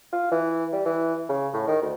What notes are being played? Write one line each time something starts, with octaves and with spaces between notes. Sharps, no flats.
F4
E3
G3
E3
C#3
A2
D#3
D2